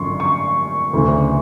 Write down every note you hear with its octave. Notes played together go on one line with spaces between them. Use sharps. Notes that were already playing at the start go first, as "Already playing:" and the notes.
Already playing: G#1 F#2 D3 F3 C6 C#6
C#6
D2 C#3 E3